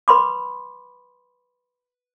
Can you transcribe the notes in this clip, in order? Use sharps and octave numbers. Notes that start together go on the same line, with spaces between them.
B4 B5 C6 D6